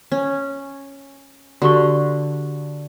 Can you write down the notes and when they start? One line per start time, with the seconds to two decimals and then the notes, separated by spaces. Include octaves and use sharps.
0.12 C#4
1.62 D3 F#4 G4 C#6